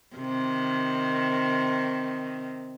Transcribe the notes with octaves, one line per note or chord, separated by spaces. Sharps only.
C3 D#3